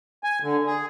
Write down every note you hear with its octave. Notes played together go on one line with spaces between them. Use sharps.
G#5
D3
G#4